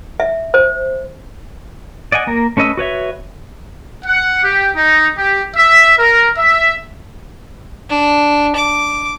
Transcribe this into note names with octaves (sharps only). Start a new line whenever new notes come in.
E5
C5
D5 D#5 F#5 G#5
A#3 A#4
A3 C#4 B4 D#5 E6
F#4 B4 C#5 E5
F#5
G4
D#4
G4
E5
A#4
E5
D4
D6